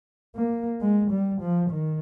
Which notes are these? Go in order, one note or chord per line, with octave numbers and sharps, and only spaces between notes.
A#3
G#3
G3
F3
D#3